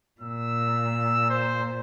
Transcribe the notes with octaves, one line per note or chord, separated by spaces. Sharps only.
A#2 E6
C5